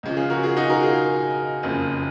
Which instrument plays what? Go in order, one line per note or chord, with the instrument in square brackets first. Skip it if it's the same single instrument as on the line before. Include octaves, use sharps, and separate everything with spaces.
[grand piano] C#2 C#3 F3
F4 G#4
F#4 A#4
F4 G#4
D#4 F#4
F#4 A#4
F4 G#4
F#1 F2 C#3 F3